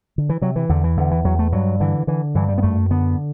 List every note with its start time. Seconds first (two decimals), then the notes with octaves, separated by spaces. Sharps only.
0.18 D3
0.29 E3
0.41 C3 F#3
0.56 E3
0.69 E2 D3
0.84 E3
0.97 E2 D3
1.11 E3
1.24 E2 F#3
1.39 A3
1.52 G2 F#3
1.80 D3 E3
2.07 D3 E3
2.35 G2 E3
2.49 G3
2.58 B3
2.63 F#2 A3
2.91 D3 B3